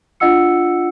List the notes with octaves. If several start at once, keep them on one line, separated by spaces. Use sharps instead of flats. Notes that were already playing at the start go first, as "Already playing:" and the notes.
D4 F4 D#5 F#5 E6 C#7